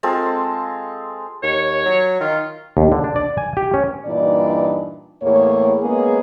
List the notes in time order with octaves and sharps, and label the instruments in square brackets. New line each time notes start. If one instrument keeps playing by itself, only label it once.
[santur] G#3 C4 F4 A4
[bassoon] D#2 [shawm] C#5
[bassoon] F#3
[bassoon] D#3 [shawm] F4
[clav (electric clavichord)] D#2
D3
D4
D5
G#5
G4
C#4
[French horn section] G2 A#2 E3 D4 D#4 D5
E2 A2 A#3 G#4 C#5
G#3 A#3 B3 C#4 G#4